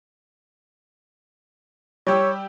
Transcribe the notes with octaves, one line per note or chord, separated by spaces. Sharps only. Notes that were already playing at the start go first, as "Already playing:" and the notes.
G3 G4 C#5 E6